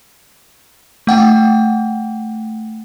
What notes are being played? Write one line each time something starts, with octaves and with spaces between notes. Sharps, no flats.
A3 F#5 G5